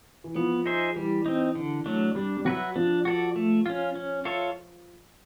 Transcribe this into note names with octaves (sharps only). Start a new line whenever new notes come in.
E3
F3 B3
D#4 G#4 C5 E5
E3 G3
C4 D#4
D3
F#3 A3 D4
G3 D4
G3
F#3 F#4 B4 E5
F3 D4
F#4 A4 D5
A3
C#4 F4
C#4
F4 A4 C#5 E5